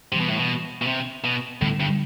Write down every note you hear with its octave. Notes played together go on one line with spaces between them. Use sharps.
C3 E3 G3 D4
B2
A2
B2
B2
C3
B2
A2 D3 G3 B3
G2